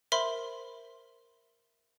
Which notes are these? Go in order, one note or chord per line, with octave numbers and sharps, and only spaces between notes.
A#4 C5 E5 B5 C6 G7